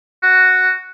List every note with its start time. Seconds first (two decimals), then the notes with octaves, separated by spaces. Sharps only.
0.23 F#4